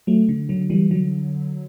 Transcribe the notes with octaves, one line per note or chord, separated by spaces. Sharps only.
F#3 A3
D3
D3 F#3
E3 G3
D3 F#3